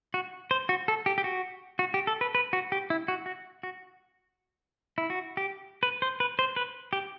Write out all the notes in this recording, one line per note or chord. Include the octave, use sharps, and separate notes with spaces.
F#4
C5
F#4
A4
G4
G4
F#4
F#4
G4
A4
B4
B4
F#4
G4
E4
F#4
F#4
F#4
E4
F#4
G4
B4
C5
B4
C5
B4
G4